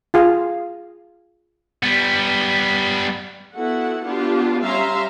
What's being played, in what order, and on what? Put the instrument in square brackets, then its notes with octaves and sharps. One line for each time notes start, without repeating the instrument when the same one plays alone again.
[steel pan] F4 G#4 F5
[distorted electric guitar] G3 B3
[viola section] B3 E4 F#4 A4 F#5
B3 D4 F4 G4
G3 C#4 E5 F5 A#5 C6